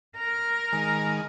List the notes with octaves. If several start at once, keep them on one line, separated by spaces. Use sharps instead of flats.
A#4
D#3 G#3